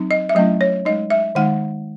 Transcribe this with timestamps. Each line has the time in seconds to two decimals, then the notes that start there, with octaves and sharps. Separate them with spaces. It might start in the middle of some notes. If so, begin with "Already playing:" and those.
Already playing: F#3 C4 D#4
0.11 D#5
0.29 E5
0.35 F#3 A3 C#4 E4 D#5
0.61 C#5
0.85 G#3 D#4 D#5
1.10 E5
1.35 D#3 G#3 D#4 F#5